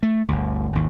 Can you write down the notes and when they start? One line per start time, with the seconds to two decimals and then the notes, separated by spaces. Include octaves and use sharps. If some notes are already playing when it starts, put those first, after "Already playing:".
0.03 A3
0.28 G1 D2
0.73 G#1 D#2